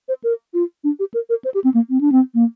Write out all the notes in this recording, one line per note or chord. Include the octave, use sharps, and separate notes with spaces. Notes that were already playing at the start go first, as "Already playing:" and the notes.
C5
A#4
F4
D4
G4
A#4
A#4
C5
G4
C4
A#3
C4
D4
C4
A#3